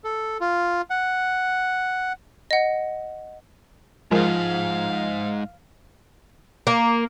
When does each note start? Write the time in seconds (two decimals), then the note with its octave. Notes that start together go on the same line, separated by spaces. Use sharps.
0.04 A4
0.41 F4
0.90 F#5
2.51 D#5 F#5
4.11 C#2 G#2 F3 G#3 A#4 F5
6.67 A#3